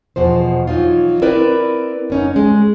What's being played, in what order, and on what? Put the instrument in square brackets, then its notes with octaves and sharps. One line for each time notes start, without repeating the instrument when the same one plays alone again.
[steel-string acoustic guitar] E2 B2 F3 C5
E3 F#3 D#4 F4
C4 E4 A#4 B4 D5
F#2 C#4 D#4
G#3